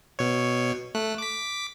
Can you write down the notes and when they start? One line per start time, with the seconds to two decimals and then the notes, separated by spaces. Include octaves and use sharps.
0.19 B2 C#5
0.95 A3 F#6
1.18 D6 B6